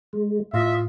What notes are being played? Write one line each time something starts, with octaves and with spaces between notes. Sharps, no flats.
G#3
A2 F4 D#5 E5